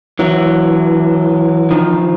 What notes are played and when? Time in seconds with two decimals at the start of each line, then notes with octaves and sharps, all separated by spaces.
0.19 E3 F#3
1.71 D#3 F3